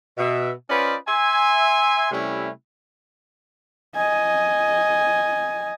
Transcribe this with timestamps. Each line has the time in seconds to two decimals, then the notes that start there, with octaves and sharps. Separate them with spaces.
0.18 B2 E5
0.69 C#4 F4 B4 C5 D5 D#5
1.07 E5 G#5 C6
2.11 C3 G3 A3 C#4 E4
3.96 D#5 G#5